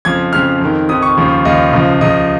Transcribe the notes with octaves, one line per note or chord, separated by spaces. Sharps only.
F2 C#3 F3 G#6
F2 C#3 F3 F6
F2 D#3
F2 D#3 D#6
C#6
D#2 C#3 F3
D#2 C#3 F3 D#5
C#2 C#3 F3
C#2 C#3 F3 D#5